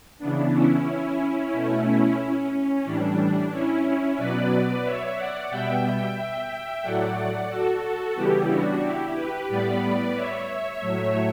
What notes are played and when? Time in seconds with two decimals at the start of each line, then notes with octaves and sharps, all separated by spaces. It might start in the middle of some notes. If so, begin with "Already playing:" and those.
0.19 C#3 E3 B3 D4
0.52 C#4 E4
1.53 B2 A3
2.19 C#4
2.51 C#4
2.85 A2 E3 G3 D4
3.17 D4
3.51 C#4 E4
4.17 B2 F#3 B3 B4 D5
4.83 C#5 E5
5.16 D5 F#5
5.50 B2 G3 B3 E5 G5
5.83 E5 G5
6.16 E5 G5
6.82 A2 F#3 A3 D5 F#5
7.49 F#4 A4
7.82 F#4 A4
8.15 C#3 E3 G3 B3 E4 G4
8.48 D4 F#4
8.81 E4 G4
9.14 G4 B4
9.48 A2 G3 B3 B4 D5
10.14 C#5 E5
10.80 A2 F#3 A3